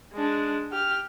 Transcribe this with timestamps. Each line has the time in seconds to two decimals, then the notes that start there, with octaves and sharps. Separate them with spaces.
0.13 G#3 D4
0.72 G4 F6